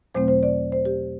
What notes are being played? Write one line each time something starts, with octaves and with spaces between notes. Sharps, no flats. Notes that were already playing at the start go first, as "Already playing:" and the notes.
E2 B2 F#3 A3 C4 C5
C5
D5
C5
G4